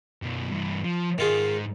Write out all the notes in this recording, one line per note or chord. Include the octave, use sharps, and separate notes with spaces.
F#2 B2
G2 E3
F3
G#2 D#3 F4 G#4